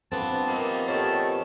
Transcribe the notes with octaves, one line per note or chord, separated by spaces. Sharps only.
G2 F3 B3 C4 A5
C3 D#3 A#3
A#2 D#3 A3 G4 C#5 A5